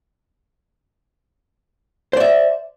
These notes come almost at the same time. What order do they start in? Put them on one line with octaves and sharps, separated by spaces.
C5 D5 E5